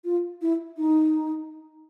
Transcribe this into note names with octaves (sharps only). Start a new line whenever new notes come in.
F4
E4
D#4